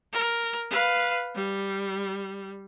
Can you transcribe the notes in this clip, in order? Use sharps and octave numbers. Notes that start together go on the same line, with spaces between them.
A#4
B4 F5
G3